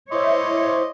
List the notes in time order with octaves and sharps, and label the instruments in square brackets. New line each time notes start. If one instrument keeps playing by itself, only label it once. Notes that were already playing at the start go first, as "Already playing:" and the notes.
[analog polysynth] E4 C5 E5 [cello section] C#5 [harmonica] D#5 C6 D6